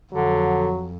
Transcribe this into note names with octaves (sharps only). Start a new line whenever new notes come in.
F2 D3 F#3